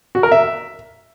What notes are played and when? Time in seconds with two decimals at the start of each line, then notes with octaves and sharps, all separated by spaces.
0.15 F#4
0.23 A#4
0.32 E5